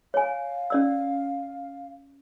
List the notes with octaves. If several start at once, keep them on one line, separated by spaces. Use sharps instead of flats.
C#5 F5 G#5
C#4 D5 E6